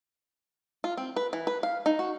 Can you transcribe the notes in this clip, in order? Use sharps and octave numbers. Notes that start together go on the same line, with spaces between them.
F4
C4
B4
E3
B4
F5
D#4
F#4